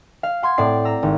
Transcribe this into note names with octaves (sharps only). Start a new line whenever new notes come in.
F5
F#5 C6 G#6
A2 C4 D5 C7
A#5 E6
G#1